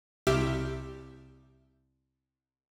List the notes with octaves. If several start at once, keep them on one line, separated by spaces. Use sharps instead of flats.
C2 G4 E5 F6